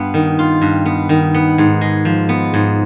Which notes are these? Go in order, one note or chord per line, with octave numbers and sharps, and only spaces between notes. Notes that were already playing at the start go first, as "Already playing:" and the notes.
Already playing: G2 B3 F4
D#3
F4
G2
B3
D#3
B3
G#2
G#3
F3
B3
G#2